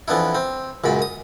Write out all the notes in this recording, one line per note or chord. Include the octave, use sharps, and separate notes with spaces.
F2 E3 B3 D4 E4
C4
C#2 F#2 A#2 B5
D#6